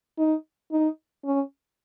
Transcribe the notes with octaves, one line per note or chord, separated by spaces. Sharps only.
D#4
D#4
C#4